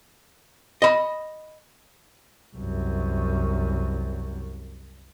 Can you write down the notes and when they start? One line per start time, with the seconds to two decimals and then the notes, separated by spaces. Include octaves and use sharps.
0.82 D#5 B5
2.55 C2 F#2